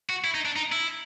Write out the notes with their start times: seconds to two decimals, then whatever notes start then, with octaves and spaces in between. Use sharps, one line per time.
0.09 F#4
0.24 E4
0.35 D#4
0.45 D4
0.56 D#4
0.72 E4